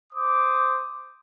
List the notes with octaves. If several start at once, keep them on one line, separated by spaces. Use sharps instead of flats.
C5 D6 D#6